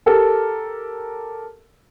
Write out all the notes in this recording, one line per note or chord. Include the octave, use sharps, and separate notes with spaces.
G4 A4 A#4